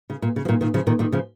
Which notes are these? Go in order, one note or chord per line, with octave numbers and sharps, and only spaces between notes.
C#3
A#2
C#3
F3
A#2 D#3
A#2 D#3
C#3 F3
A#2 D#3
A#2 D#3
C#3 F3